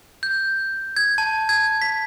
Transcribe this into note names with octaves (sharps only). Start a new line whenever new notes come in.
G6
G#6
A5
G#6
B6